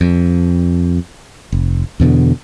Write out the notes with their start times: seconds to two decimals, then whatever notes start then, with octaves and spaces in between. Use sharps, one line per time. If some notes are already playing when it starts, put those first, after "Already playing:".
0.01 F2
1.52 F1
2.00 E2 B2 D3